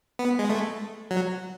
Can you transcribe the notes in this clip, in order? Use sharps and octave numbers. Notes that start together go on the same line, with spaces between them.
B3
G#3
A3
F#3